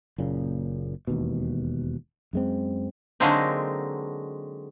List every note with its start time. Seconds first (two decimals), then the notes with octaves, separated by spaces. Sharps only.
0.18 F#1 A#2 C#3
1.07 E1 D#2 B2
2.33 F#2 G#3 C4
3.20 D3 F#3 G#3 A#3 C4 D#4